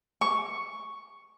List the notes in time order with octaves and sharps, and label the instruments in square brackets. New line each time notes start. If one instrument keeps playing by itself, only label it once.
[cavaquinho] C#6